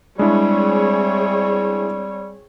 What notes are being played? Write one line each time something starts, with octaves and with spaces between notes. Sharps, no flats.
G3 G#3 C4 D4 E4 G#4 C#5